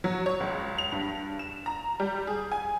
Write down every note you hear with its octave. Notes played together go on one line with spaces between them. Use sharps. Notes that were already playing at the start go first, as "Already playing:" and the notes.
F#3
C#5
C#2
F7
G2
E7
A#5
G3
G#4
G#5